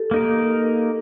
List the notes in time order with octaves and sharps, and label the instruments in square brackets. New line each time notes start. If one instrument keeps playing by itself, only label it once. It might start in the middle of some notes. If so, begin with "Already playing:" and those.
Already playing: [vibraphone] G4 A4
[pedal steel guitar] A#3 D#4 A#4